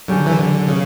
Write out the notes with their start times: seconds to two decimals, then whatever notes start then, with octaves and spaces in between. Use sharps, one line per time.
0.08 D3 F#3 C#4 G4
0.26 E3
0.39 D3
0.69 C#3